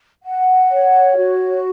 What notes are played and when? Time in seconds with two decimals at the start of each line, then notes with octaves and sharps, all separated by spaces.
0.23 F#5
0.70 C#5
1.17 F#4